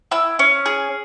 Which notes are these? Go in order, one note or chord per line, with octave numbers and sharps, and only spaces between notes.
E4 E6
C#4
G#4